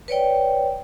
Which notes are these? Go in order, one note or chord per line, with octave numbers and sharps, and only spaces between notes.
B4 C#5 D5 G5